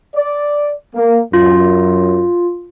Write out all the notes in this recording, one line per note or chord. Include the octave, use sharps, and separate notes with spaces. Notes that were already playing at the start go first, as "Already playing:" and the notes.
D5
A#3
F#2 F4